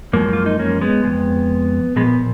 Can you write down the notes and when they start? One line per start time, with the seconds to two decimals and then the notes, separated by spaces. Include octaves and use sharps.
0.13 F#2 F3 G#3 A#3
0.33 F4
0.46 D#4
0.59 A#3 C#4
0.81 G#3 B3
1.05 F2 C#3 G#3
1.96 A#2 F3 G#3 B3